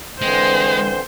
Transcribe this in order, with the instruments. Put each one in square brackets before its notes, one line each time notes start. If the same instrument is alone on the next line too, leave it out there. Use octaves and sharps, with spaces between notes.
[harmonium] D3 E3 C4 [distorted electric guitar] G#3 [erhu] C5